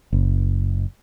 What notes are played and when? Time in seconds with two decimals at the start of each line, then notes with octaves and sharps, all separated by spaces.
0.12 F#1